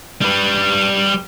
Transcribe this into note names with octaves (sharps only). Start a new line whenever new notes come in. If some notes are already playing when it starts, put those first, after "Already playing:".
G3 B4